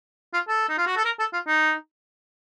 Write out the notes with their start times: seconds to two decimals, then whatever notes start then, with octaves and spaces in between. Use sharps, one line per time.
0.34 F4
0.48 A4
0.69 D#4
0.78 F4
0.87 F#4
0.97 A4
1.05 A#4
1.20 A4
1.33 F4
1.47 D#4